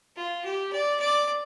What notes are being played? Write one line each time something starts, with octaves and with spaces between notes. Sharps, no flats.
F4
G4
D5
D5